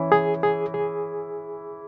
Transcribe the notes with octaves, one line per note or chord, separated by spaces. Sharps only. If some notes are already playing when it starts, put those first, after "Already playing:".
Already playing: E3 C#4 E4
G#4
G#4
G#4